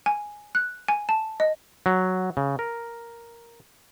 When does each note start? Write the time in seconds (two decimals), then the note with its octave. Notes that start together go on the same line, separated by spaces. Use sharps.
0.06 G#5
0.55 F#6
0.88 G#5
1.09 A5
1.40 D#5
1.86 F#3
2.37 C#3
2.59 A#4